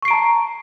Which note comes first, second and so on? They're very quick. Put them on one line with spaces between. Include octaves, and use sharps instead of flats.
C#6 C7 D7 A#5 A5